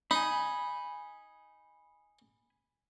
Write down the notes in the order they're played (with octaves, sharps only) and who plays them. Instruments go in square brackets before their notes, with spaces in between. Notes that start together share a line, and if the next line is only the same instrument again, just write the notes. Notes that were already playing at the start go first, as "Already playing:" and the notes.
[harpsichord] D#4 [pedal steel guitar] G#5 B5